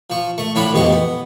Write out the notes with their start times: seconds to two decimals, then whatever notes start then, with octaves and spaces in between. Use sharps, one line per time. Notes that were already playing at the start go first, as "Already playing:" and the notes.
0.10 F3 C#6
0.38 A3 C#6
0.55 A2 F3 D4 C#5 B5
0.73 A1 F2 B2 G#3 G4 C#6
0.93 B3